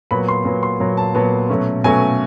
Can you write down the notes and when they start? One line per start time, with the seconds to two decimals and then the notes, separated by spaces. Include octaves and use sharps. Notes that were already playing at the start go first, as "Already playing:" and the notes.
0.11 A#2 F#3 B3 B5
0.28 C6
0.45 A#2 F#3 B3
0.63 C6
0.80 A#2 F#3 B3
0.97 A5
1.15 A#2 F#3 B3 A5
1.50 B2 F#3 A3 C#4
1.84 B2 F#3 A3 C#4 G#5